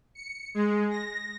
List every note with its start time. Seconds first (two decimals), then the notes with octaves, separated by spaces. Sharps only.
0.15 C#7
0.54 G#3
0.91 A#6